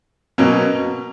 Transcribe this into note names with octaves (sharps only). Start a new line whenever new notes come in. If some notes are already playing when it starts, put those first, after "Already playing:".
B2 F#3 A#3 C#4